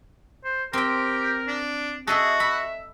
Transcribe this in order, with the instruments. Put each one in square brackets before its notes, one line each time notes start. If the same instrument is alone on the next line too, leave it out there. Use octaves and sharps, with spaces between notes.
[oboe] C5
[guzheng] C4 G5 [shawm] G4 [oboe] A#4
[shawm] D4
[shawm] F#4 [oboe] G#4 [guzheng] A4 D#5 E5
[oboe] E5 [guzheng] B5